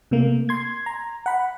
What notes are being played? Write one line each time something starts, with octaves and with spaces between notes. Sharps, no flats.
C3 A3 A#3
C6 G#6
A#5
F#5 B5